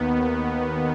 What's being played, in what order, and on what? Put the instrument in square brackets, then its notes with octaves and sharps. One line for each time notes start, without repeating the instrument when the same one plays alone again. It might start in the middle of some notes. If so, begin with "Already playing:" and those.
Already playing: [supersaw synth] D#2 D#3 B3